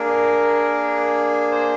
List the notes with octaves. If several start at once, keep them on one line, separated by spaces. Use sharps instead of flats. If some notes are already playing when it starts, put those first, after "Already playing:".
Already playing: A#3 D4 G#4 A#4
C5